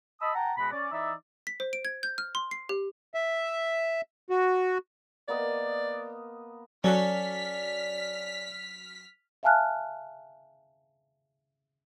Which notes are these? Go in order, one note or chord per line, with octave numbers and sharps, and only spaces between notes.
D#5 A5 B5 D#6 E6
F#5 G5 A5 A#5
B2 G#3 F#4 B5
C#4 D5
E3 D#4 D5 E5
B6
C5
D7
G#6
G6
F6
C6
C7
G4
E5
F#4
A#3 B3 D5 D#5
F#3 C#4 F#4 A4 D5 F6 B6
E5 F5 G#5 A5 F6 F#6